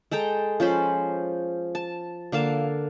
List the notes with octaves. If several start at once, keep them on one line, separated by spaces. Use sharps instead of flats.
G#3 A4 G5 A#5
F3 C#4 C5 B5
A5
D3 A#3 F5 A5